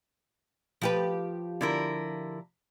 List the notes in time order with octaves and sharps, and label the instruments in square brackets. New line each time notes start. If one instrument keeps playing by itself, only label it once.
[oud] F3 G4 B4
[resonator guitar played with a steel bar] D3 E4 A#4